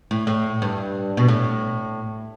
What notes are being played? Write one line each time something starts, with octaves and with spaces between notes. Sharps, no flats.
A2
A2
G2
B2
A2